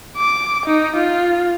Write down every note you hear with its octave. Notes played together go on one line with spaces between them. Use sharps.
D6
D#4
F4